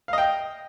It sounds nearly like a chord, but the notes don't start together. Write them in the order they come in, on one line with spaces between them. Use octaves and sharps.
F5 D#5 G5